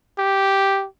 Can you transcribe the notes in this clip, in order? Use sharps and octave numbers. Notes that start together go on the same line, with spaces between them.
G4